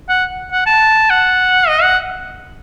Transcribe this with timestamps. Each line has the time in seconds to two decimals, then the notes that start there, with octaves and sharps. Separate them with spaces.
0.09 F#5
0.52 F#5
0.66 A5
1.10 F#5
1.68 D#5
1.82 F#5